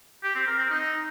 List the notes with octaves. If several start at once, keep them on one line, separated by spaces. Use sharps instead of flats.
G4
C4
A#4
C4
D#4